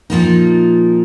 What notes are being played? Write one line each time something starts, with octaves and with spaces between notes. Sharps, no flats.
A#2 F3 A#3 D#4